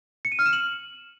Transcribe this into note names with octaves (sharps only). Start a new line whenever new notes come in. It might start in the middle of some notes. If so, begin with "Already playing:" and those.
C#7
D#7
F6
E7
F#7